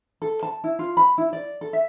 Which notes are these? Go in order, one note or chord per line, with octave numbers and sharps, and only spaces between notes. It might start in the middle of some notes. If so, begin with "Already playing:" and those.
A4
A5
E4
F4
B5
E4
D5
A4
E5